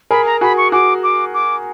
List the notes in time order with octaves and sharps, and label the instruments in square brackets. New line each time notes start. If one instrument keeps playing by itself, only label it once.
[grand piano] G#4 A#4 [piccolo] B5
[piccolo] A#5
[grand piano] F#4 G#4 [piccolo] B5
[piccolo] C#6
[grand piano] F#4 G#4 [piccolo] D6
[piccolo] D6
D6